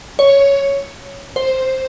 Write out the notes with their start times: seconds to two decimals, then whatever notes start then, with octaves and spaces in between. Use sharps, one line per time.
0.19 C#5
1.36 C5